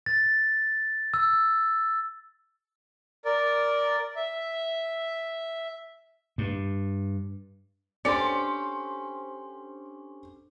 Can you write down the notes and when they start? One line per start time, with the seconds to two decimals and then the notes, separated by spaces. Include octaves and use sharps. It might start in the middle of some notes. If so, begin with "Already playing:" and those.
0.06 A6
1.14 E6
3.25 A#4 D5
4.16 E5
6.38 G2
8.05 C#4 D4 G4 A4 C5 D5 C6 C#7